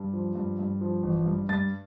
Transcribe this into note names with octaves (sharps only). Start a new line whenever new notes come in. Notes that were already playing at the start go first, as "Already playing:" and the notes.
Already playing: G2
F3
G2
G2
F3
A1
G2
G2 A6